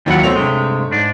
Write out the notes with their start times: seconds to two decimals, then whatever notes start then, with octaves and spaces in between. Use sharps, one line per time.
0.06 D#2 D#3 F#3 E4 F4 F#5
0.23 B2 A3 C4 C#5 F7
0.36 G2 C3 G#3
0.92 G#2 D4